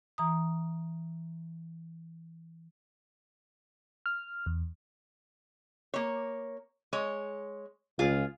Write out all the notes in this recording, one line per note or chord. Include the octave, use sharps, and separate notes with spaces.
E3 A#5 D#6
F6
E2
A#3 C#5
G#3 C#5
C#2 F4 G#4